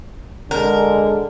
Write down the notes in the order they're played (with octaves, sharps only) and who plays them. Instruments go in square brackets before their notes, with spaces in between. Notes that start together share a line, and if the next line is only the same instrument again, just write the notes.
[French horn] D3 [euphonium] G#3 [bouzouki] A#4